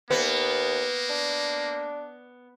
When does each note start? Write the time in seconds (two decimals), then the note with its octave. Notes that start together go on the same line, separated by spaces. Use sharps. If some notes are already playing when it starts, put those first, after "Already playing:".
0.10 D#2 A#3 B3
1.10 D4